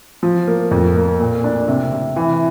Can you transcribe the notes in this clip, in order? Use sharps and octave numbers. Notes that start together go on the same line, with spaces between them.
F3
A#3
F2
A#3
A#2
D4
C3
C3
E3